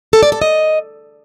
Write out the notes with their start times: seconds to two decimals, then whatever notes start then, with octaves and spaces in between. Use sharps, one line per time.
0.13 A4
0.23 D5
0.32 A4
0.42 D#5